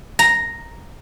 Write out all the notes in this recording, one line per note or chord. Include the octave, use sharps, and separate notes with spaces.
A#5